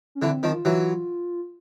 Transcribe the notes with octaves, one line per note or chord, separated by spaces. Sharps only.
C#4
D3 E3 C4
D#3 F3
F4
E3 F#3